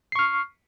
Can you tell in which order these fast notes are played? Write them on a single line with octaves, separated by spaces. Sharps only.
C7 C#6 F6